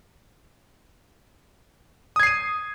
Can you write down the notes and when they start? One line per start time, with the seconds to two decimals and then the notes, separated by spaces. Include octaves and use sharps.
2.16 D#6
2.20 G#6
2.23 C7
2.27 D#7